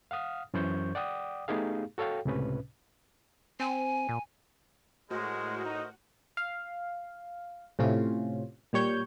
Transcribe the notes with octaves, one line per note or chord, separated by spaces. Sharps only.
F5 F#5 D#6 F6
F#2 E3 C#4 C5 C#6 G6
D5 F#5 G5 D6 D#6
A3 B3 D#4 G4 G#4 F5
F#4 A4 C#5 F5 G5
C#2 A2 C3 C#4 B4
C4 G#5
A#2
A2 G#3 F#4 A#4 C5 D#5
D#4
F5
A2 C3 C#4 F4
A#2 G3 C#5 G6